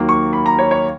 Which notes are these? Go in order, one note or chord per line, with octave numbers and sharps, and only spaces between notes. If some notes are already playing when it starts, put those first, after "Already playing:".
Already playing: D#2 D#3 F#3 A#3
C#6
B5
A#5
C#5
C#5